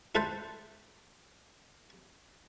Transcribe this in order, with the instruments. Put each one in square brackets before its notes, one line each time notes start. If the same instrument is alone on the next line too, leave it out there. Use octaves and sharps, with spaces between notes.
[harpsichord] E4 A4 B4 C5